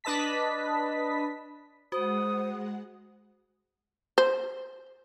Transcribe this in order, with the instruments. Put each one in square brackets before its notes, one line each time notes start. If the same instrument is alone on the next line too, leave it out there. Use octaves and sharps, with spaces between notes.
[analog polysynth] D4 B4 D#5 A5 B6
[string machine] G#3 F#5 [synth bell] F#4 [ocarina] C5 [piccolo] D#6
[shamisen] C5